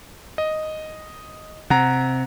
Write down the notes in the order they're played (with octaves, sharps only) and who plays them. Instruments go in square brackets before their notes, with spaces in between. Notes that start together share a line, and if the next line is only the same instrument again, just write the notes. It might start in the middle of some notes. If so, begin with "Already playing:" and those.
[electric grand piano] D#5
[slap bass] C3 [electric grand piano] F#5 A#5